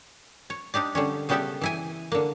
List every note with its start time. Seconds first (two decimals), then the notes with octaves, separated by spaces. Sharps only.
0.50 C#5
0.74 D4 D#4 G4 D5
0.95 D3 G3 C#4
1.29 C#3 G3 B3 G4 A4 E5
1.61 E3 E4 G#5
2.12 D3 A#3